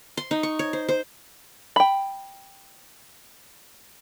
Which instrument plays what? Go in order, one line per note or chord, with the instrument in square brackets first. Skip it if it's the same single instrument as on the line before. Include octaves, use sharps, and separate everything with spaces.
[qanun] C6
D#4
C#6
C#5
C5
C5
[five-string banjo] G5 B5